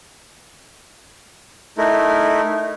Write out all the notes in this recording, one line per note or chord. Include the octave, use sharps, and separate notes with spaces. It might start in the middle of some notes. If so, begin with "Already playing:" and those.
A3 D#4 E4 A#4